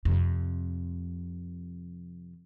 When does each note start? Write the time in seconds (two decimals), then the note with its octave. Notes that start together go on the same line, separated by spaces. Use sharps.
0.05 F2 C3